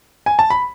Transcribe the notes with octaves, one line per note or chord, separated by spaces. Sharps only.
G#5
A5
B5